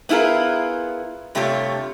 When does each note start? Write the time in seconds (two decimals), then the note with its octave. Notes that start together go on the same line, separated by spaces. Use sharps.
0.09 B3 E4 F4 G#4 A#4
1.35 G2 C3 A3 F4 G4 C#5